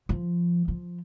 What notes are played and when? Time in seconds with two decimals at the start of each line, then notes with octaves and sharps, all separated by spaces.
0.09 F3
0.68 F3